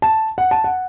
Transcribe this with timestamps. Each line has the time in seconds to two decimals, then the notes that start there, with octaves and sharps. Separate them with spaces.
0.02 A5
0.38 F#5
0.51 A5
0.64 F#5